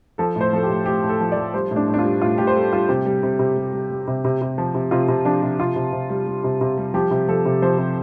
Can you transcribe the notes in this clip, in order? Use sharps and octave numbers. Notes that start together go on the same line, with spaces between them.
F3 A4
A2 C5
F3 A4
G4
A2
A2 G4
A2
A4
F3
D5
F3
G3 C5
A2
D4
A2
D4
F4
G3
A2 F4
A2 G4
C5
G3 A4
G3 F4
C3 G4
G3
C3
C3
G3
G3
G3
C3
C3
C3
F3
C3
C3 F4
C3
F3 D4
C3
C3 F4
C3
C3
G3
G3
C3
C3
G3
F3 G4
C3
F3 A4
C3
F3 C5
C3